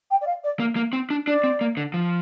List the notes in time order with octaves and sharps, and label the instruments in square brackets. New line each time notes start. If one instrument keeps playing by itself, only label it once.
[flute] G5
D5
F5
D5
[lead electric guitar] A#3
A#3
C4
D4
[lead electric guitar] D4 [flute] D5
[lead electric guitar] C4
A#3
D3
F3